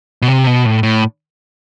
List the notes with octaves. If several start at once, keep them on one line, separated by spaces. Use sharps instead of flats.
B2
C3
B2
A2
A2